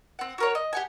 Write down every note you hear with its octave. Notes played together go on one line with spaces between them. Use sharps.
C4 F#5
F#4 A#4 C#5
D#5
G4 F#5 G#5